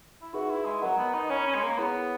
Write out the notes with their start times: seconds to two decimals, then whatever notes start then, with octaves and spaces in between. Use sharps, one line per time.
0.22 E4
0.33 D#4 F#4 G#4 B4 E5
0.50 E4
0.65 G#3
0.82 F#3 A#4 D#5 F#5 A#5
0.98 B3
1.14 D#4
1.30 C#4 C#5 G#5 B5
1.47 C#4
1.55 G#3
1.63 A#3
1.78 B3 E4 G#4 C#5